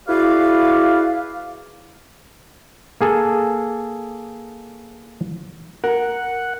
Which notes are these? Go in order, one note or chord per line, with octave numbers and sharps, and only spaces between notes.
E4 F#4 G#4 B4 D5 F5
A#3 G#4 A4
A#4 F#5